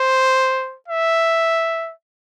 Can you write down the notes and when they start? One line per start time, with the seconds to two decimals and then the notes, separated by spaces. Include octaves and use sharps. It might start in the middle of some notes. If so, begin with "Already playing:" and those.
Already playing: C5
0.88 E5